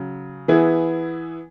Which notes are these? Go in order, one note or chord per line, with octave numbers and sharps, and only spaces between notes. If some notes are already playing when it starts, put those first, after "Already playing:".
Already playing: C#3 F#3
E3 B3 E4 G#4